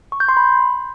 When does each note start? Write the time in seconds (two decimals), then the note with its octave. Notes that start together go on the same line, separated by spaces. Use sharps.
0.12 C#6
0.20 G6
0.29 C6
0.37 B5